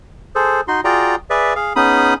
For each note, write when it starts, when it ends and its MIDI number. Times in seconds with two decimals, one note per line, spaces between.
0.35 0.61 68
0.35 0.61 69
0.35 0.61 72
0.68 0.81 63
0.68 0.81 66
0.68 0.81 84
0.84 1.15 65
0.84 1.15 66
0.84 1.15 68
0.84 1.15 74
0.84 1.15 79
0.84 1.15 82
1.30 1.54 68
1.30 1.54 71
1.30 1.54 74
1.30 1.54 76
1.56 1.73 68
1.56 1.73 77
1.76 2.14 59
1.76 2.14 61
1.76 2.14 63
1.76 2.14 68
1.76 2.14 83
1.76 2.14 87